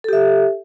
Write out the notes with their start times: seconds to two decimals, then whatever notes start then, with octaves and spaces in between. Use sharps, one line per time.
0.04 A4
0.09 G4
0.13 E5